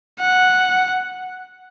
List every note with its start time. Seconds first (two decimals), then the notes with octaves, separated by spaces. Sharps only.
0.20 F#5